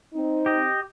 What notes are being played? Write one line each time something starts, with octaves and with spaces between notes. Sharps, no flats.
C4 D#4
G4 D#5